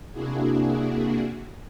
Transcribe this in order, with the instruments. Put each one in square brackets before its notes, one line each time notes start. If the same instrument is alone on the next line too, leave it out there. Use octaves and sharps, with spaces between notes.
[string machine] C3 A#3 D4 E4 F#4 G#4